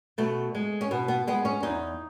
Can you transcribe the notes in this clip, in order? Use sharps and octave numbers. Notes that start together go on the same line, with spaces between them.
B2 A3
G#3
C#4
B2 B3
B3
G#3 B3
C#4
E2 D#4